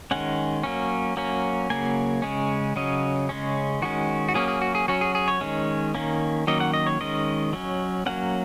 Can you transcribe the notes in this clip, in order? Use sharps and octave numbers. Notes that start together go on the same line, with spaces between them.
D#3 G#3 C#4 F#5
F#3 A#3 C#4
F#3 A#3 C#4
C#3 F#3 A#3 G#5
C#3 G#3 C#4
C#3 F#3 C#4 D#5
C#3 G#3 C#4
D#3 G#3 C#4 F#4
F#4
F#3 A#3 C#4 G#4
G#4
F#4
G#4
F#3 C#4 F#4
G#4
G#4
C#5
D#3 G#3 C#4
D#3 A#3 C#4
D#3 F#3 A#3 C#4 D#5
F#5
D#5
C#5
D#3 G#3 C#4 D#5
F#3 C#4
F#3 A#3 C#4 F#5